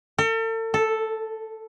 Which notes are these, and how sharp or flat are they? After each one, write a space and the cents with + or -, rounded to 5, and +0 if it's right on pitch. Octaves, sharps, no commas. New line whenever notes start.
A4 +40
A4 +0